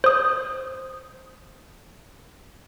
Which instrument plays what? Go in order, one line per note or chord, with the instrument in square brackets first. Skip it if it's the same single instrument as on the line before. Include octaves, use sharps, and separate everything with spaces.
[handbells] C5 D#6